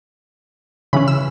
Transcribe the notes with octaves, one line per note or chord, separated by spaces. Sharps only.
C#3 E3 C#4 B5
E6